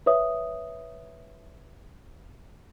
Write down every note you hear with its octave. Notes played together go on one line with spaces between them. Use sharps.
B4 C#5 E5 D#6